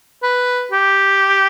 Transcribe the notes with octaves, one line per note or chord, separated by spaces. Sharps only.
B4
G4